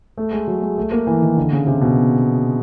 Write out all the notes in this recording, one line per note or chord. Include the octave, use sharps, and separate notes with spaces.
A3
G#3
F#3
G#3
A3
A#3
E3
D#3
D3
C#3
C3
B2